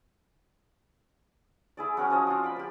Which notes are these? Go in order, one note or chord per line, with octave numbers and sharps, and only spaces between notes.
E4 G#4 D5
F#3 C#4 A#4 D#6
F3 F#3 D#5
C4 F4
D5 B5
G4 A#4